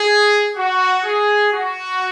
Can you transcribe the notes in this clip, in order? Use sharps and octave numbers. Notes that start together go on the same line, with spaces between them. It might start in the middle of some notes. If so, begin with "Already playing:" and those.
Already playing: G#4
F#4
G#4
F#4